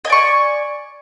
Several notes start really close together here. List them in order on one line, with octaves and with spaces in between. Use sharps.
D#5 G#5 D5 C#6